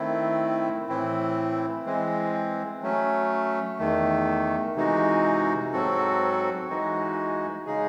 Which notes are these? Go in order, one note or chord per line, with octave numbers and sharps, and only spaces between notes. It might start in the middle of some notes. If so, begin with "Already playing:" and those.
Already playing: D#3 A3 C4 E4
A2 E3 C4 E4
E3 G#3 C4
F#3 A3 C#4
E2 D#3 A3
C3 E3 G#3 D#4 F#4
G#2 F#3 C4 F#4 A4
E3 G#3 D#4 F#4
C#3 G#3 D#4 G#4